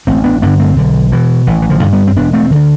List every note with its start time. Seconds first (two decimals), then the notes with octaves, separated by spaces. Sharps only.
0.07 A1 A3 C4
0.24 B3 D4
0.42 G2 D3 B3 D4
0.60 A3 C4
0.76 B1 D3
1.12 B2 E3
1.47 A1 E3
1.62 E3
1.70 D3 F3
1.81 G2 D3
1.93 G3 B3
2.08 C4
2.16 E1 B3 D4
2.33 A3 C4
2.51 D2 D3 E3